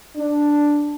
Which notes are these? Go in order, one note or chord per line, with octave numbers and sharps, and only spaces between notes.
D4